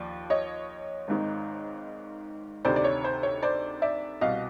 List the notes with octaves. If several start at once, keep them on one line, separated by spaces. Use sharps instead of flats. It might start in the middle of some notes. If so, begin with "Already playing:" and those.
Already playing: D#2 F3 D5
C#5 D#5
G#1 G#2 D#3
D2 C3 D#3 C5 D5
D5
C#5
C5
C#5
C5 D5
D5 E5
C2 B2 D#5 F5